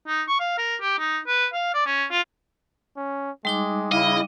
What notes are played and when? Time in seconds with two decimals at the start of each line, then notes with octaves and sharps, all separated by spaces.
0.07 D#4
0.28 C#6
0.40 F5
0.58 A#4
0.81 G4
0.99 D#4
1.27 B4
1.53 F5
1.74 D5
1.86 C#4
2.11 F4
2.97 C#4
3.45 G3 G#3 D#4 D6
3.92 C#3 E4 D#5 F5